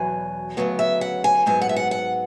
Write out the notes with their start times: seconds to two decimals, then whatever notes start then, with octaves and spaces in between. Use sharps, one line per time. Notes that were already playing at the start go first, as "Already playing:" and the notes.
Already playing: E2 B2 F#3 G#5
0.57 D2 C#3 F#3 B3
0.79 E5
1.01 F#5
1.24 G#5
1.46 G#2 F#3 B3 G#5
1.61 F#5
1.69 E5
1.76 F#5
1.91 F#5